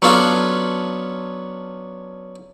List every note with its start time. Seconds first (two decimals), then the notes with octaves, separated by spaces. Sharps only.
0.02 F#3 B3 C#4 D4 F4 A4